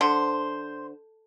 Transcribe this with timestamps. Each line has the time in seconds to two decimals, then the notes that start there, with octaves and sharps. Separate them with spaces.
0.01 D3 C5